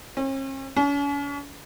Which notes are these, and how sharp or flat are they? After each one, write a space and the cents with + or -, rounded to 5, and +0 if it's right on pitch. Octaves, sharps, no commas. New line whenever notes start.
C#4 -45
C#4 +40